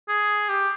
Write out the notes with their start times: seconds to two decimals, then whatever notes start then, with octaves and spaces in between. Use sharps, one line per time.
0.09 G#4
0.49 G4